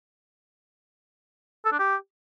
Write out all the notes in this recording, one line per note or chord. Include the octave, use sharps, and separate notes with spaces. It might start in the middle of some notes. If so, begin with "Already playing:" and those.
A4
D4
G4